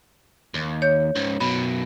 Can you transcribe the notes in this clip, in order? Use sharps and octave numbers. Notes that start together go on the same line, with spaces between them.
D#2
C#5 G6
C#2 G#2
F#2 B2 B5